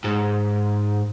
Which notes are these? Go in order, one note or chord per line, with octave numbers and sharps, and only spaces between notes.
G#2